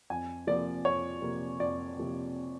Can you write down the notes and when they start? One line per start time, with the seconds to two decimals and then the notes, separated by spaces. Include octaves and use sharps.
0.10 F2 G#5
0.47 C3 F3 A#3 D5
0.85 F2 C#5
1.22 C3 F3 A#3
1.60 F2 D5
1.98 C3 F3 A#3